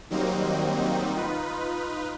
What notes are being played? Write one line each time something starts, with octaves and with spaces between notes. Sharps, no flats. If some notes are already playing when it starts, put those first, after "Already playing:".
D#3 F#3 G3 A#3 C4 D#4
D#4 F4 B4